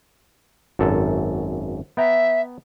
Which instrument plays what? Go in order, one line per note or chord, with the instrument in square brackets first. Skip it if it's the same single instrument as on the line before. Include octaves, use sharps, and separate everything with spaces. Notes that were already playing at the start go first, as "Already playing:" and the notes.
[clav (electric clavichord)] G#1 F#2 A4
[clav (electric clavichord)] B3 G5 A#5 [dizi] E5